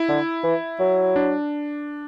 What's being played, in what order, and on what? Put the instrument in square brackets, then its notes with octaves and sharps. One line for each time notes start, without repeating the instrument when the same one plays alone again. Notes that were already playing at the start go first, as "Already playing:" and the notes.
Already playing: [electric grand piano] E4
[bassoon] D3
E3
F#3
[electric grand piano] D4